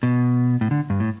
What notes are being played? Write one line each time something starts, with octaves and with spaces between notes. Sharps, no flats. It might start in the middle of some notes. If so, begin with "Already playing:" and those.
B2
A2
D3
G2
A2